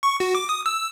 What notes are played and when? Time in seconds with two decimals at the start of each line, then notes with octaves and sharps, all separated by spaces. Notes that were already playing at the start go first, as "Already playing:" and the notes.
0.03 C#6
0.20 F#4
0.35 D6
0.49 D#6
0.66 E6